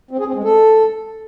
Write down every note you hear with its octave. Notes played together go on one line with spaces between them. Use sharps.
C4
G#4
C4
G#3
A4